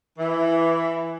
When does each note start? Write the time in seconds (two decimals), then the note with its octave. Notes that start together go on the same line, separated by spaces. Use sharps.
0.19 E3